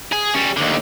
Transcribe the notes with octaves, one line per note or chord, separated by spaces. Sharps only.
G#4
G3 C#4
D#2 D3